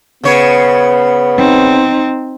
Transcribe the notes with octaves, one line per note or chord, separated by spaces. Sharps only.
C#3 B3 C#5
C4 D#4